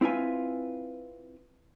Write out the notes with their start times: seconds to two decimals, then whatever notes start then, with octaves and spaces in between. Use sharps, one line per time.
0.01 C4 E4 F4 B4 G#5